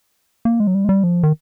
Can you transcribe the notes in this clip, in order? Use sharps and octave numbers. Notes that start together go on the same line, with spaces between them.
A#3
G#3
F#3
G3
G#3
G3
F3
D#3